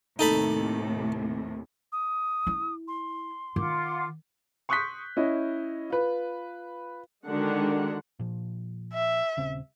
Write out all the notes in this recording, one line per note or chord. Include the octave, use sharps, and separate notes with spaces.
D#2 A2 C3 D#4 A4 B5
D#6
E4
C6
D#3 F4 F#5 D6
C6 C#6 D#6 F#6 G6 B6
C#4 E4 D#5 E5
F4 B4
D3 D#3 G#3 D4 F#4 F#5
A#2 F3
E5
D#1 C#3 C4